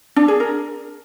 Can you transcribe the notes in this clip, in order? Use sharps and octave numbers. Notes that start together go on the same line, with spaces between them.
D4
G#4
A#4